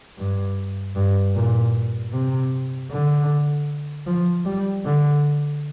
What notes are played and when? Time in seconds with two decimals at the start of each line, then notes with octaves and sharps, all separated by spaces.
0.18 G2
0.96 G2
1.35 A#2
2.13 C3
2.91 D3
4.07 F3
4.45 G3
4.85 D3